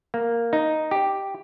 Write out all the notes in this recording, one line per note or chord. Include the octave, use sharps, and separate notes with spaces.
A#3
D#4
G4